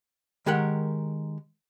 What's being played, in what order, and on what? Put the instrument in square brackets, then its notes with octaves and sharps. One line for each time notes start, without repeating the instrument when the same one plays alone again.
[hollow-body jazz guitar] D#3 G#3 G4 A#4 F#5